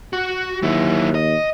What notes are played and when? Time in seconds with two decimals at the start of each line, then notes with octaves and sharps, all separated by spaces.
0.13 F#4
0.62 D#2 F#3 E4
1.15 D#5